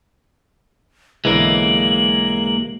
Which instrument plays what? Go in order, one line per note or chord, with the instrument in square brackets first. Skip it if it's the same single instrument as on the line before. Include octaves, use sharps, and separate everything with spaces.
[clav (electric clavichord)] B1 D3 E3 [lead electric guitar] G#3 A#3 [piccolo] F#7